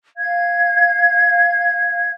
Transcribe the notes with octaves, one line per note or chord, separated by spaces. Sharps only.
F5 G#6